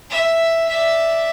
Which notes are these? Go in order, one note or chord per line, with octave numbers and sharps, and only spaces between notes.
E5
D5 E5